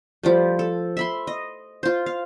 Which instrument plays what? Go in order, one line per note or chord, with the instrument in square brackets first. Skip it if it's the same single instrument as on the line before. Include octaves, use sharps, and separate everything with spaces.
[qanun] F3 G3 A3
A4
E5 B5 C6
D#5
F4 C5
F5